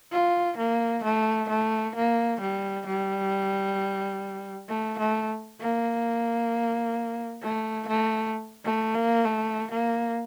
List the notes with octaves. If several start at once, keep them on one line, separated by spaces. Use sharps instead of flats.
F4
A#3
A3
A3
A#3
G3
G3
A3
A3
A#3
A3
A3
A3
A#3
A3
A#3